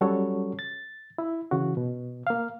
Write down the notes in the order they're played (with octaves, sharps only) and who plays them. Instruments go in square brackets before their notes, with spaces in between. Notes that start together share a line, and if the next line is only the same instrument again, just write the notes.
[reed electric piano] F#3 G3 C#4 F#4 A4 C#5
A6
E4
C#3 E3 F#4
B2
A#3 F5